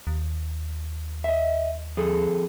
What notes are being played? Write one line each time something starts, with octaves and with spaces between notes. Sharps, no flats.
D#2
D#5 E5
F2 G#4 A4